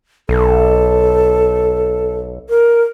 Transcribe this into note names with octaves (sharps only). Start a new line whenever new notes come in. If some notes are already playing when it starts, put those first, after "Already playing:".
B1 A4
A#4